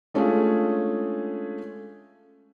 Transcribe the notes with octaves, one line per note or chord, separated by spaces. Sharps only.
G#3 A3 C#4 D4 F4 G#4